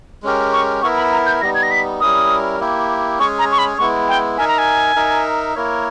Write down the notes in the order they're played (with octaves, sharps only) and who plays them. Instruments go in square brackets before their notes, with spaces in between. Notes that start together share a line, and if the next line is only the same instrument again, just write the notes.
[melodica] G#3 C#4 G4 A#4
[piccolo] C#6
[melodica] B3 E4 A#4 E5 [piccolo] C#6
[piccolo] B5
A#5
G6
[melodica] G3 B3 D#4 [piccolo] A#6
[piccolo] G#6
A#6
B6
[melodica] G3 C#4 E4 A#4 [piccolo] D#6
[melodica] A#3 E4 G4
[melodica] G#3 C#4 G#4 C#5 [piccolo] C#6
[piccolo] A#5
C#6
B5
[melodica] G#3 B3 E4 [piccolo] C#6
[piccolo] G5
[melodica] D#4 A#4 E5 [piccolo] G#5
[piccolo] A#5
G#5
[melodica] D#4 A#4 E5
A#3 E4 A#4 C#5